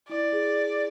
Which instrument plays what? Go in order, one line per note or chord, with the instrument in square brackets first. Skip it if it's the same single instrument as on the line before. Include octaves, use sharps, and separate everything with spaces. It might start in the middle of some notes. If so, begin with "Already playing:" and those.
[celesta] E4 [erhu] D5
[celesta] G#4